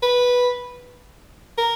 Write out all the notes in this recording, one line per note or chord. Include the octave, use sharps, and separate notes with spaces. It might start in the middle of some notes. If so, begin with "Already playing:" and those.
B4
A#4